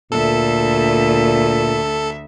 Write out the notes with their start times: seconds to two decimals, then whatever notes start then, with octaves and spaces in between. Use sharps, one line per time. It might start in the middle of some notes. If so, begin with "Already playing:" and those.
0.12 D2 A#2 A4 E5